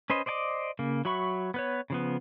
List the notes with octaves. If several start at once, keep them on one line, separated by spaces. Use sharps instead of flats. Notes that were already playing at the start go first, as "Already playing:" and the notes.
C#4 B4 C5 D#5
C5 D5 D#5 G#5 D6
C#3 A#3
F#3 F#4 E5 B5 C#6
B3 B4 C#5
C#3 F3 B3